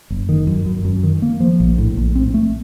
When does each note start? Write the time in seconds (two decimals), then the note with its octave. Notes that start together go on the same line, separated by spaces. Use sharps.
0.10 F#1
0.29 D#3
0.47 F#2
0.66 F#2
0.85 F#2
1.03 D#3
1.22 A#3
1.40 F3
1.60 A#1
1.78 A2
1.97 A#1
2.15 C4
2.34 A3